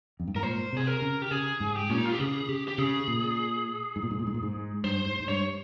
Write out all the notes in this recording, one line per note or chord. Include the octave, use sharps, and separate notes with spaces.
F2
G2
G#2 A#4
A#2 C5
C3 G#4
A#4
C#3
G4
C#3 G#4
G#2
G4
A#2 C#4
D#4
F4
G4
C#3 G#4
C#3 G4
G4
C#3 G#4
A#2
G#2
A#2
G#2
A#2
G#2
A#2
G#2
G2 C5
G#2
G#2
G2 C#5